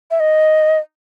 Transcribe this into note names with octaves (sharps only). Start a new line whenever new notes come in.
E5
D#5